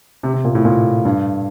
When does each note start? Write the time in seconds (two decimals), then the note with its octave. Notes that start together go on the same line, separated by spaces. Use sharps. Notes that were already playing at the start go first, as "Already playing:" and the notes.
0.23 C3
0.34 C3
0.45 A#2
0.55 A2
0.65 A#2
1.05 G2